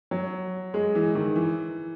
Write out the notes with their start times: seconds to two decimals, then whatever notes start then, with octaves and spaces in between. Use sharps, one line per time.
0.11 F#3
0.74 G#3
0.95 E3
1.15 D#3
1.36 E3